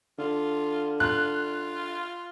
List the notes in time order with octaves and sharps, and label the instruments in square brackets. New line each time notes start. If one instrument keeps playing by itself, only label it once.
[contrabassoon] D3 [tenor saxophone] F4
[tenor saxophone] F4 [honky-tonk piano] F#6